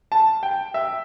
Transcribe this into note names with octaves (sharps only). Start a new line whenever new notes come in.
A5
G5
E5